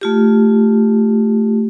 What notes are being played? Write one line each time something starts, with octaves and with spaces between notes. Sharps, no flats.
A3 F4 G4